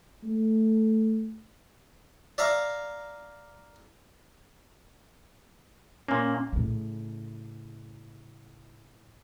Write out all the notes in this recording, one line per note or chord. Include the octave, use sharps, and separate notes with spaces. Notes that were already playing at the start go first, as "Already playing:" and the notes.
A3
D5 E5 F5 A#5
A#2 A#3 C#4
A2 C#3